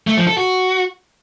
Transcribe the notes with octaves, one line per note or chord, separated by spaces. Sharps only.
A3
F3
A4
F#4